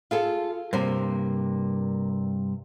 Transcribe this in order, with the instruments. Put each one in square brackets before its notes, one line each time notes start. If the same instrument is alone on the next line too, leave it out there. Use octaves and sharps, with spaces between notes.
[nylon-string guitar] F4 G#4 A4
[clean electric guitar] G2 C3 [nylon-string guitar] A#3 C5